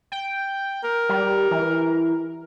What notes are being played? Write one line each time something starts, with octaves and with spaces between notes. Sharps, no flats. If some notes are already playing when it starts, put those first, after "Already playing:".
G5
A#4
G3
E3